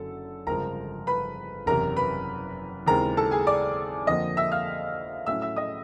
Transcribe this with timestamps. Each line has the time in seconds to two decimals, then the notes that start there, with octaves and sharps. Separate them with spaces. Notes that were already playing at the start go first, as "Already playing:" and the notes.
Already playing: F#1 F#2 D3 A4
0.46 G1 F2 C#3 F3 G#3 A#4 A#5
1.07 B4 B5
1.66 F#1 E2 C3 A#4 A#5
1.97 B4 B5
2.86 D#2 C#3 E3 G#3 C4 A#4 A#5
3.17 A4 A5
3.31 G#4 G#5
3.47 D5 D6
4.07 F2 D3 F3 A#3 D#5 D#6
4.37 E5 E6
4.52 F5 F6
5.26 A2 F#3 A3 C#4 E5 E6
5.42 E5 E6
5.56 D#5 D#6